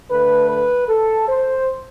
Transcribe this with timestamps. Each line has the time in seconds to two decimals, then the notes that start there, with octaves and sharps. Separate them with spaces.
0.11 D3 A3 B4
0.49 B4
0.88 A4
1.28 C5